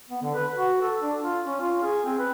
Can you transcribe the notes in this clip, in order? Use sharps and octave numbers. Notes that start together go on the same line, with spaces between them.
B3
D3
B4
F#4
A4
D4
F4
C#4
F4
G#4
C4
B4